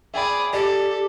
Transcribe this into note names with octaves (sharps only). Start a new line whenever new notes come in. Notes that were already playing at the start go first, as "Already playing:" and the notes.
G#4 D5 E5 G5 B5
G4 A4 D5